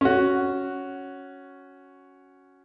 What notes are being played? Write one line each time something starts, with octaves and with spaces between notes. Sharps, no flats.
C#4 F#4